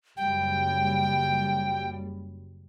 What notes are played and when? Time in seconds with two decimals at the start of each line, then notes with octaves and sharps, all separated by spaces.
0.17 F#1 G3 G5